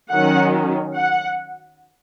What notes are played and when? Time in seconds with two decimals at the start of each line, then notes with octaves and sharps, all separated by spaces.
0.11 D#3 F#3 C#4 F#5
0.95 F#5